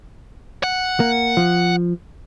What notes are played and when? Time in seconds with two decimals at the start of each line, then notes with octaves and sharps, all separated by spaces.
0.64 F#5
1.00 A#3
1.37 F3